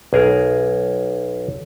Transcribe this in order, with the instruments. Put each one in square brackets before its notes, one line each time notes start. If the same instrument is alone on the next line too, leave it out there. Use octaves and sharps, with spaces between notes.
[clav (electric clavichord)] B1 G#4 A#4